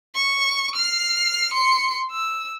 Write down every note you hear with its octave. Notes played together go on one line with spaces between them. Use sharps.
C#6
F6 C7
C6 C#7
E6